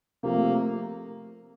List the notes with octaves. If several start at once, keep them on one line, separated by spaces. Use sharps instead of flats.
C3 F3 A3 A#3